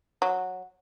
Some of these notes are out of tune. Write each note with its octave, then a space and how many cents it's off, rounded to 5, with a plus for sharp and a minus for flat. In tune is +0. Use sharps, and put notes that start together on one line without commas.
F#3 -10